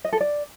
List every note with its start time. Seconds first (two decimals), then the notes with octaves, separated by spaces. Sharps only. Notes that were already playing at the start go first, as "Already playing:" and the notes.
0.05 D#5
0.13 A4
0.21 D5